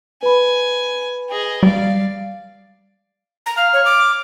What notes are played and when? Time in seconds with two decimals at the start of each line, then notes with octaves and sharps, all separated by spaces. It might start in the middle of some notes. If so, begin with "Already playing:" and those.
0.23 B4 G#5 B5
1.30 G#4 D#5
1.63 G3 D5 F5
3.46 A#5
3.57 F5 F6
3.73 C#5
3.85 D6